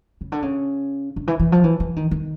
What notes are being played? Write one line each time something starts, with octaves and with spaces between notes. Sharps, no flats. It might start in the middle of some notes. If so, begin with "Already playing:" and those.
C#3
D3
C#3
D3
E3
E3
F3
E3
E3
D#3
D#3